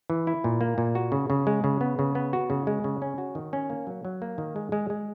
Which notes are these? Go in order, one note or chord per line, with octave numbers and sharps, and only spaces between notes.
E3
E4
A#2
A#3
A#2
F#4
C#3
C#3
G#3
C#3
B3
C#3
B3
F#4
C#3
G#3
C#3
C#4
F#4
D#3
C#4
A#3
F#3
F#3
A#3
D#3
G#3
G#3
G#3